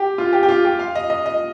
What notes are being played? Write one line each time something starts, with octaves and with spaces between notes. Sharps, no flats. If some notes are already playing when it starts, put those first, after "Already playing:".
Already playing: G4
F4
G4
G4
F4
G4
F5
D#5
D#5
D#5